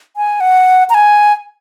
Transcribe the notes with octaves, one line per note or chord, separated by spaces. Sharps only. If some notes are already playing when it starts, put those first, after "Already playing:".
G#5
F#5
A#5
G#5